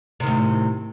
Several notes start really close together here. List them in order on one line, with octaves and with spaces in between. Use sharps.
C3 D#3 A2